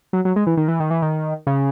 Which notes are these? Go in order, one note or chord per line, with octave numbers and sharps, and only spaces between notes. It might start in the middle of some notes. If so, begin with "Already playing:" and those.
F#3
F#3
G#3
E3
D#3
E3
D#3
E3
D#3
C#3